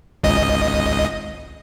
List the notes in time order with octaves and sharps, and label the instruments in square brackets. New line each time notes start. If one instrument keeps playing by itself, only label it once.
[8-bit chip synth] G#1 C#2 D#5